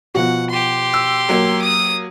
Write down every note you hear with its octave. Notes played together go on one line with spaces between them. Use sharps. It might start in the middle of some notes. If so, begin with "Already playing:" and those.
B2 F3 F#4 F#5
G4 C6
E6
F#3 A#3
D#6